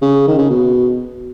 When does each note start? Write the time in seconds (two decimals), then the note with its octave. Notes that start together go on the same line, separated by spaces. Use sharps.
0.02 C#3
0.27 D#3
0.38 C#3
0.50 B2